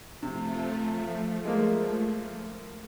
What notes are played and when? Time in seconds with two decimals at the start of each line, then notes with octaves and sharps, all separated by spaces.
0.23 C3 F3 A3
1.45 G#3 A#3